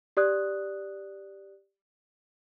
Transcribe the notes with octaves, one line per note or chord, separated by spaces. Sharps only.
G4 D5 D#6 F#6